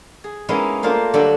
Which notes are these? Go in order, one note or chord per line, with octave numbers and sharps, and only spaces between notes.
G#4
G#3 A#3 B3 C#4 D#4 E4
A3 A#3 D4 F4 C5
D3 F#3 G3 F#4 A4 G5